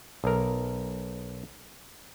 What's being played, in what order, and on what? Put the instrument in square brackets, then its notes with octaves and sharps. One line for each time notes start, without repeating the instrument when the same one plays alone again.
[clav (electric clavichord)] B1 A#4